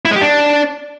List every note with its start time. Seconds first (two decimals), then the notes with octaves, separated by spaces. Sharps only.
0.05 E4
0.11 G#3
0.16 G4
0.21 D4